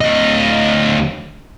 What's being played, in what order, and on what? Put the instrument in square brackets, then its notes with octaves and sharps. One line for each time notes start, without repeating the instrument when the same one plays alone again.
[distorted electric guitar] D2 D#5